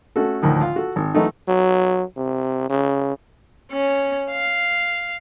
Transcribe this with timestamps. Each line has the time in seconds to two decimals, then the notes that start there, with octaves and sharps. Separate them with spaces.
0.16 A3 C#4 F#4 A4
0.42 D2 A2 D3 D#3 F3
0.61 F4 F5
0.76 F#4 A4
0.96 G#1
1.15 E3 F#3 A3 D#4
1.48 F#3
2.17 C3
2.70 C#3
3.72 C#4
4.30 F5